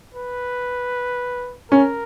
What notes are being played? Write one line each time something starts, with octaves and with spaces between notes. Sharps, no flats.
B4
C#4 A#4